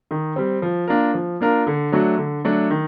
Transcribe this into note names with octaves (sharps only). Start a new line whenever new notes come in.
D#3
G3 C4
F3
A#3 D4 F4 A#4
F3
A#3 D4 F4 A#4
D3
F#3 A3 D4 F#4
D3
F#3 A3 D4 F#4
D#3